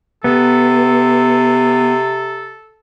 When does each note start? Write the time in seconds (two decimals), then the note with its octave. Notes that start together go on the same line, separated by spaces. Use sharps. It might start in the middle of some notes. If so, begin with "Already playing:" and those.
0.24 C3 B3 A4